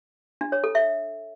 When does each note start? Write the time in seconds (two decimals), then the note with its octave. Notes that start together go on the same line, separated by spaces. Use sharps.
0.41 D4
0.52 C#5
0.64 A4
0.75 E5